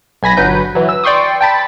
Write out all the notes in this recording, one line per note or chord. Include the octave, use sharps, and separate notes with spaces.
B1 G#5 B5 A#6
G1 F#3 B4 G6
E3 F#3
E6
D5 G5 C6 C#6 D#6
G5 A5 B5 A6